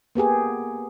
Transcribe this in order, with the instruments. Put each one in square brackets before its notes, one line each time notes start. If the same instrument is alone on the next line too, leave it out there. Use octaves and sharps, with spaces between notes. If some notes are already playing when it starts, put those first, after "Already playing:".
[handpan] A#3 B3 G4 G#4